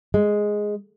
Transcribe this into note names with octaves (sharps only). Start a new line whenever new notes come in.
G#3